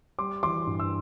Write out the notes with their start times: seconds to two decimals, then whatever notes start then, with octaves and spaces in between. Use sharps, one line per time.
0.19 G3 C6 D6
0.43 E3 C6 D6
0.67 G2
0.80 E6